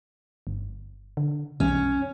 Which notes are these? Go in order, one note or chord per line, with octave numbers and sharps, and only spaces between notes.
G1
D3
B1 C#4